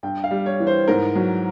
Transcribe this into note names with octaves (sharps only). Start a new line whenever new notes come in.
G2 G5
F5
G3
C#5
E3
C5
G#2 A#4
F#3